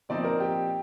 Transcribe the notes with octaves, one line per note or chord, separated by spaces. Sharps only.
A#2 F3 C4 D#4 D5
A#4
G4